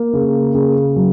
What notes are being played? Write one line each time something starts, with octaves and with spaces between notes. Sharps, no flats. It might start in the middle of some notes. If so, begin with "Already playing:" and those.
Already playing: A#3
C#3
C#3
F#3